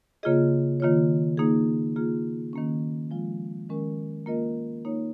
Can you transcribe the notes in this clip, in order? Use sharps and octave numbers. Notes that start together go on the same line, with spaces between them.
C#3 A#3 F4 G#4 D#5
D#3 A#3 F4 C#5
A#3 D#4 G#4
A#3 F4 G#4
D#3 A#3 C#4
F3 G#3 F4
D#3 G#3 C#4 A#4
A#3 F4 A#4 D#5
A#3 D#4 C#5